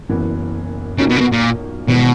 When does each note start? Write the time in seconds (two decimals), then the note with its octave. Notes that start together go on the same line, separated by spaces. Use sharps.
0.09 F#1 F#2 E3 B3
0.99 B1 A#2 C#3 A#3 D#4 F#4
1.10 B2
1.17 C#3
1.21 B2
1.32 A#2
1.88 G#1 B2 E3 G#3